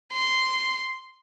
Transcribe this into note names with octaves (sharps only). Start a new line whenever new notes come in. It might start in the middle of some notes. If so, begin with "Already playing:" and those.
C6